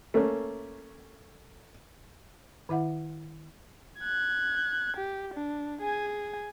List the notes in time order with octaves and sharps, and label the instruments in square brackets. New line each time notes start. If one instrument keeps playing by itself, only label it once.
[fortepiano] A3 A#3 C#4
[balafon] D#3 E4 E5 F#5
[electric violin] F#6 G#6
G4
D4
G#4 G#5